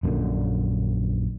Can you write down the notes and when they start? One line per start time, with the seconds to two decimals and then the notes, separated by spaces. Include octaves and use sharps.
0.03 A#1 F#2 A#2 D3